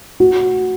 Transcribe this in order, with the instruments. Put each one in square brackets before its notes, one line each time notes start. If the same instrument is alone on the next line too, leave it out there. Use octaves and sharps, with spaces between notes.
[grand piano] F#4